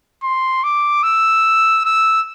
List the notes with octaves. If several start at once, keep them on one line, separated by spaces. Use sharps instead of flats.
C6
D6
E6
E6